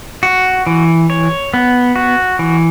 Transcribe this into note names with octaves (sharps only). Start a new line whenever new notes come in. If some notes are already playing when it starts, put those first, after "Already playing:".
F#4
E3
C#5
B3
F#4
E3